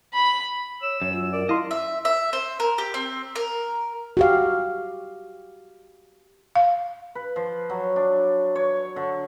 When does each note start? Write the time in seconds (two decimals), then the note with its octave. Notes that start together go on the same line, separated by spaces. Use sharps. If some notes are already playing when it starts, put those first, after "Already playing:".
0.13 B5
0.82 C#5 E6
1.02 F#2 C#5
1.13 F4 E7
1.32 A#4 D5
1.49 E4 D#5 F5 C6
1.71 E5
2.05 E5
2.33 C5
2.60 A#4
2.78 G4
2.94 C4
3.36 A#4
4.17 F#4 G4 F5
6.56 F5
7.15 B4
7.36 F3
7.70 F#3
7.96 D4
8.55 C#5
8.96 D3